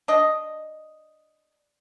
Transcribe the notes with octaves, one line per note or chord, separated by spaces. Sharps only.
D4 D#5